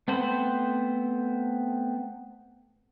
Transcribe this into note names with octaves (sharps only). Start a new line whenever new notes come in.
A3 B3 C4 C5 B5